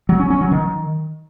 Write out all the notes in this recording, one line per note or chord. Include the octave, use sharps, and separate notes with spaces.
F#3
C#4
C#4
F#3
D#3